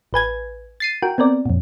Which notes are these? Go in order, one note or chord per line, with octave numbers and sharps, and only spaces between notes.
A1 B4 G#5 G#6
A6 C7 D#7
F#4 A#4 G5
B3 C4 A#4 D5
F2 A#2